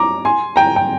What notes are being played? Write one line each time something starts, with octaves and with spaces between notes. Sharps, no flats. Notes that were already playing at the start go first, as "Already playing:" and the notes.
Already playing: A#5 D6
G#5 C6
G5 A#5
G5